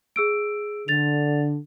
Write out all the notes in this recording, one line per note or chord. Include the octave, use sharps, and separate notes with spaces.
G#4 E6 D7
D3 A6 F7